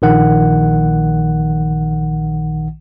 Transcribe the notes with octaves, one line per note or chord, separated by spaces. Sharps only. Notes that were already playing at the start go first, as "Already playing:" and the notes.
A#1 D#3 F#5